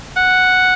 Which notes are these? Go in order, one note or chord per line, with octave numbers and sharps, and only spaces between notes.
F#5